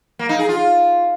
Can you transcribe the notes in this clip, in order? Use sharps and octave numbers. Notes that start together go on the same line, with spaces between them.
A#3
D#4
G#4
F4